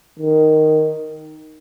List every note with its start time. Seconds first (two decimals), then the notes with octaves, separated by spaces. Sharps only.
0.20 D#3